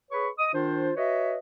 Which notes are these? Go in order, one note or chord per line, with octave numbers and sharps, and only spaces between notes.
G#4 B4 C#5 B5 C#6
D#5 D#6
D#3 D4 F4 C5
F#4 B4 C#5 D#5 E5